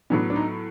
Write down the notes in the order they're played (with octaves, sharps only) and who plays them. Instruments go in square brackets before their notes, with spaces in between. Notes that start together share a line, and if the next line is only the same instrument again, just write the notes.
[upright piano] A2 F#3 B3 [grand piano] D4
[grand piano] D4
D#4